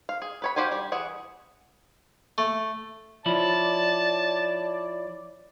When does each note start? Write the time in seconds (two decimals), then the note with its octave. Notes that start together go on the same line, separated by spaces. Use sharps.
0.09 F5
0.22 G#4
0.42 B4 C#5 B5
0.56 F#4 G4 C5 F5 G#5
0.72 G3
0.92 E3 G#4 F#5
2.38 A3
3.26 F3 E4 C#5 D5 A5